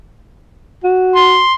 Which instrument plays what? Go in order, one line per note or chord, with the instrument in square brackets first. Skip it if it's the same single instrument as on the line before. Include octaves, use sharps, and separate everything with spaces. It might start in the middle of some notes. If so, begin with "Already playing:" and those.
[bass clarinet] F#4
[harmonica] C6